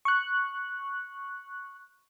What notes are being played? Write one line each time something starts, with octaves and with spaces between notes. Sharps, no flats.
C#6 F#6